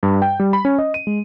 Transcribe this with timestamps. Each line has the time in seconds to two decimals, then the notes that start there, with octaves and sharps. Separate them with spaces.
0.03 G2
0.22 G5
0.40 G3
0.53 B5
0.65 C#4
0.78 D#5
0.94 D#7
1.07 G#3